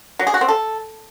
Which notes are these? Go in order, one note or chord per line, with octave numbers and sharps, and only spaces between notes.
F#3
G#4
F#4
C4
A4